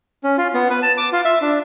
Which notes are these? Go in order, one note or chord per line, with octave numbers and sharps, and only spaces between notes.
C#4
F4
B3
B4
A5
D6
F4
E5
D4